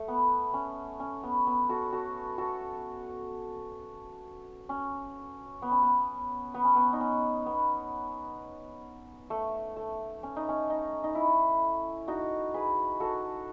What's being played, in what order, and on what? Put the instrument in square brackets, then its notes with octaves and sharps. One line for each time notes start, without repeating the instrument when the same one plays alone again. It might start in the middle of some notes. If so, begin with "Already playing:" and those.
Already playing: [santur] A3
B3
C#4
C#4
B3
B3
F#4 A4
F#4 A4
F#4 A4
C#4
B3
C#4
B3
B3
C#4
B3
D#4
C#4
B3
A3
A3
C#4
D#4
C#4
D#4
D#4
E4
D#4 F#4
G#4 B4
F#4 A4